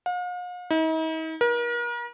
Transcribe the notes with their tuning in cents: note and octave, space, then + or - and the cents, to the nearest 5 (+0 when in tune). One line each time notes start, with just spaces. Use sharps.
F5 +45
D#4 +45
A#4 +40